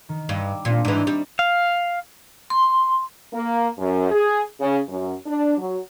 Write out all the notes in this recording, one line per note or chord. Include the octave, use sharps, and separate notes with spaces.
D#3
G2 D6 E6 E7
A#2 G3 C4 D4
G#2 E3 D#4 D5
G3
F5
C6
A#3
F#2
G#4
C#3
F#2
D4
F#3